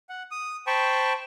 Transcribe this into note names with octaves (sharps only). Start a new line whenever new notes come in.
F#5
D#6
C5 G5 A5 B5 C#6